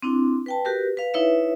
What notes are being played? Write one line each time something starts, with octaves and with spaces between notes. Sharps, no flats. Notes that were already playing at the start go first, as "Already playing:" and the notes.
C4 D4 E4
B4 G5 A5
F#4 G4 A#4 B4
B4 F5
D#4 E4 B4 C#5 E5